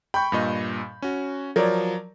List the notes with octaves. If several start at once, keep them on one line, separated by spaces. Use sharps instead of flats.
G5 B5 C#6 G6
G2 A#2 D#5
C#4 F#4
F3 F#3 A#4 C#5 D5